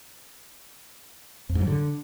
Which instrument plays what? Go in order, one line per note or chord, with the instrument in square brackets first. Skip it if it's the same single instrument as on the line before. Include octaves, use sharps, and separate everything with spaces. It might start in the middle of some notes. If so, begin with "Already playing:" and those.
[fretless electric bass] F2
G#2
F#3
D3